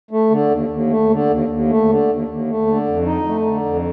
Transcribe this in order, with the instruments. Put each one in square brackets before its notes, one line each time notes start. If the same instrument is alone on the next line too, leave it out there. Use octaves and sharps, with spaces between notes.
[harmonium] A3
D3
D#2
D#2
A3
D3
D#2
D#2
A3
D3
D#2
D#2
A3
D3
F2
D#4
A3
D3
F2